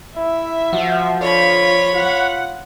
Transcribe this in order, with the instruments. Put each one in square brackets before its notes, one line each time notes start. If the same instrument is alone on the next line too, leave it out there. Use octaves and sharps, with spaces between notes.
[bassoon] E4 [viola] E5
[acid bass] F3 [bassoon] F#4
[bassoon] D3 [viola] F4 [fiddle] C#5 B5
[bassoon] F4 [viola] F#5